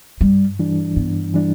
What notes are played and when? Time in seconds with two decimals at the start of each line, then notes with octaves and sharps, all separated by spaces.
0.21 G2 G3
0.59 E3 G3 D4
0.96 G2 B3
1.34 E3 G3 D4